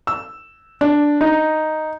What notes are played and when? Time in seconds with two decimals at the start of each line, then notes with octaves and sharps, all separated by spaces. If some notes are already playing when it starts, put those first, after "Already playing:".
0.07 E6
0.81 D4
1.21 D#4